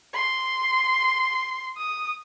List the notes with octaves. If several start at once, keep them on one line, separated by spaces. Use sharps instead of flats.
C6
D#6